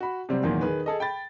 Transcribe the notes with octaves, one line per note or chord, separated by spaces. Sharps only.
F#4 B5
C3 F#3 G3 C4
E2 A#2 D#3 F#3
D#3 G#4 B4
G#4 A4 D#5
G5 B5 A6